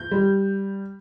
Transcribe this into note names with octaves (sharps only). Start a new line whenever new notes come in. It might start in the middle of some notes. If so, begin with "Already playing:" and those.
Already playing: G6
G3